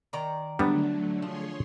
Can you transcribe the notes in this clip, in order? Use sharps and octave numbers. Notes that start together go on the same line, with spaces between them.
D#3 D5 A#5
D3 F#3 G3 A3 B3 D4
F3 G#4 C#5 C6